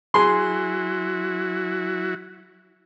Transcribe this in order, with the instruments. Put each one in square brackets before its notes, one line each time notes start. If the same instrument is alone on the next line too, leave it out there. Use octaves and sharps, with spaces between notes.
[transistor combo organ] F#3 E4 F#4 [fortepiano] G#4 C6